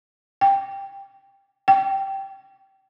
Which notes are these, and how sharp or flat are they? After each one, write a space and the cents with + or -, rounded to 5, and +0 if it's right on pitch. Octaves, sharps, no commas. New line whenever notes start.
G5 +10
G5 -10